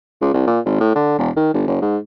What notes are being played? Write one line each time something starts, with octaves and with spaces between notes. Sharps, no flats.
C#2
C2
A#2
G#1
A2
D3
E1
D#3
G1
F#1
G#2